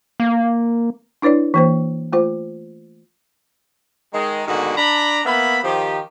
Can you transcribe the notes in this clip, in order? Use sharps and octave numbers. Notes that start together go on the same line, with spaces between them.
A#3
D4 E4 B4 C#5 D5
E3 A#3 C5
A3 F4 C5
D#3 G#3
G#2 B2 D3 D#3 A#3 F#4
D4 A#5 B5
A#3 B3 E5 B5
D#3 F3 G4